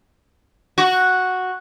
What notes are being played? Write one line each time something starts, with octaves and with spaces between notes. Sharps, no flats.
F#4